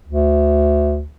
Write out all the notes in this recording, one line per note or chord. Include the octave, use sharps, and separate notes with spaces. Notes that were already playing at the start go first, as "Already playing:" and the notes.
D2